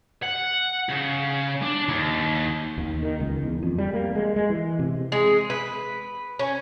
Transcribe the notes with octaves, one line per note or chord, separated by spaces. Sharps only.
F#5
C#3
D4
D#2
D#2
D#3
C#2
E2
F2
G3
A#3
G#3
G#3
E3
C3
G#3
B4
C#4